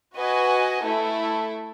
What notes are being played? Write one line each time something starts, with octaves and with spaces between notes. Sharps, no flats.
F#4 B4 D#5 G#5
A3 E4 A4